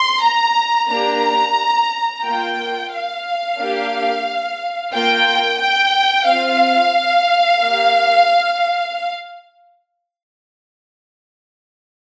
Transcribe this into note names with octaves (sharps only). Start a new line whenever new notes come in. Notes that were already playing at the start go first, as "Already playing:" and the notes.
Already playing: C6
A#5
A#3 D4 G4 A#5
A#3 F4 G5
F5
A#3 D4 G4
A#3 F4 G5
G5
C4 F4 F5
A#3 G4